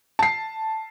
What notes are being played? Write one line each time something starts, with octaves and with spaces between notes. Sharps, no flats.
A5 C7